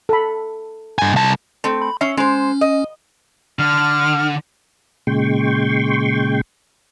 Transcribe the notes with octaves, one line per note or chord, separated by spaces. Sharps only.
A4 B5
G2 G#5
C2 A5
A3 C4
B5
C#4 E5 C7
G#3 C#4 C5
D#5
D3 F6
A#2 C#3 G#3 G5 C6 C#6